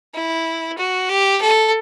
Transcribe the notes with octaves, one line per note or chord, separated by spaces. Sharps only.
E4
F#4
G4
A4